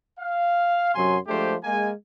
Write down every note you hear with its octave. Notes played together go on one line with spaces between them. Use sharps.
F5
F#2 C3 F#3 G#5 C6
F3 G#3 A3 D4 G4 C5
G#3 A#3 G#5